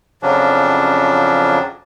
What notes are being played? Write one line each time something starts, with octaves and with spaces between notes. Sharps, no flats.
F2 C#3 F3 F#3 C#4 D4